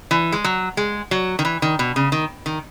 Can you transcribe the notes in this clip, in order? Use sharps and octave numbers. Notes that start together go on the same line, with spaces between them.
E3
G#3
F#3
G#3
F#3
D#3
E3
D#3
B2
C#3
D#3
D#3